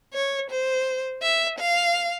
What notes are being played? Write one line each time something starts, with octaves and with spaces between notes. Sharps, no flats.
C#5
C5
E5
F5